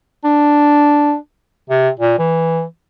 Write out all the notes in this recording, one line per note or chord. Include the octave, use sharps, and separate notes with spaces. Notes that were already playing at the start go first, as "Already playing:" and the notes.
D4
C3
A#2
E3